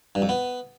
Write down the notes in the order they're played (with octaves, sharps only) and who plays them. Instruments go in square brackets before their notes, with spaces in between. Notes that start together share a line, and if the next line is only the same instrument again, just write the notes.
[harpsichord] G2
F2
B3